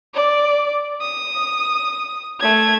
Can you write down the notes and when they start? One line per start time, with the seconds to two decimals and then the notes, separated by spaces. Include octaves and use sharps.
0.14 D5
1.01 D#6
2.40 A3 G#6